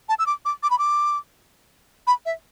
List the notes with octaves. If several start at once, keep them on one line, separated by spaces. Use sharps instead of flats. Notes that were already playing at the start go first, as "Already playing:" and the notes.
A5
E6
D6
D6
D6
B5
D6
B5
E5